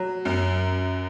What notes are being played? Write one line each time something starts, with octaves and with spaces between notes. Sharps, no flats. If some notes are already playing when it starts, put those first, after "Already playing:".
Already playing: F#3
F#2